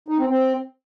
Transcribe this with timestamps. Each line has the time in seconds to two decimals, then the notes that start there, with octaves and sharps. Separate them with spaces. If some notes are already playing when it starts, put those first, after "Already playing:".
0.08 D#4
0.19 C4
0.29 C4